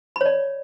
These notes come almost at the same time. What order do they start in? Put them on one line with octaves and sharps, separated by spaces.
B5 C#5 D5